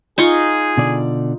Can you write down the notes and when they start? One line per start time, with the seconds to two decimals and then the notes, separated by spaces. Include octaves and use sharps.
0.18 D#4 F4 G#4 C#6
0.77 B2 D3 D5